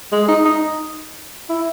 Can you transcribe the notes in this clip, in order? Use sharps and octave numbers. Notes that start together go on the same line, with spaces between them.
G#3
D#4
D#4
E4